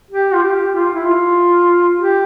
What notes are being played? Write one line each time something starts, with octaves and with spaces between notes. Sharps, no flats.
G4
F4
G4
F4
E4
F4
G4